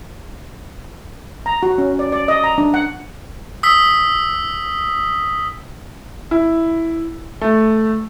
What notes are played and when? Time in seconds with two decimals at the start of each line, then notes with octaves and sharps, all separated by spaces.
1.46 A#5
1.63 F#4
1.78 C#4
1.99 D5
2.12 D5
2.28 D#5
2.44 A#5
2.58 D4
2.74 F#5
3.63 D#6 E6 B6
6.31 E4
7.41 A3